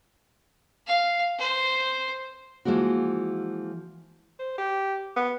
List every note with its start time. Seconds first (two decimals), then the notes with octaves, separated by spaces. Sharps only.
0.87 F5
1.39 C5
2.65 E3 F3 G#3 A#3 F#4
4.39 C5
4.58 G4
5.16 B3